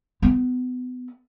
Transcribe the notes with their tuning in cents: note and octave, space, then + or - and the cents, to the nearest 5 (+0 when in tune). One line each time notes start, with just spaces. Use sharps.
B3 +30